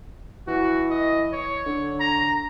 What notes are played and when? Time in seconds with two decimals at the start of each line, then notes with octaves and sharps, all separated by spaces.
0.47 E3 F#4
0.90 D#5
1.33 C#5
1.66 D3
2.00 A#5